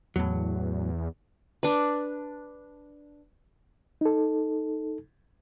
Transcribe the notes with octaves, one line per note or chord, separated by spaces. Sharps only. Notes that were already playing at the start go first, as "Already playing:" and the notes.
E2 A2 F#3
D4 B4
D#4 A4